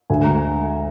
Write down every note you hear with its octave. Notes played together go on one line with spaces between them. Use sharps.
D2 G#5
G#3 A#5